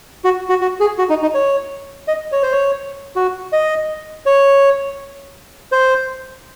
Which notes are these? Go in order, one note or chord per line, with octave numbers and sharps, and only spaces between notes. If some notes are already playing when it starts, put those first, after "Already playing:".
F#4
F#4
F#4
G#4
F#4
D#4
D#4
C#5
D#5
C#5
C5
C#5
F#4
D#5
C#5
C5